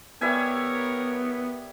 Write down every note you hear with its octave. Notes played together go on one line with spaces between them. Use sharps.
G3 B3 A#4 C#5 E5 G#5